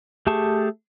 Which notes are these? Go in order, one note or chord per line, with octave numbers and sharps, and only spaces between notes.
A3 G4 G#4 A5 C#6